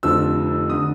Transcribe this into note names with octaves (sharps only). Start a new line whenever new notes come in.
F1 F2 D3 F3 E6
D3 D#6